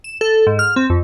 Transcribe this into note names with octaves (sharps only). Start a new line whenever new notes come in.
E7
A4
G#2
F6
C4
F2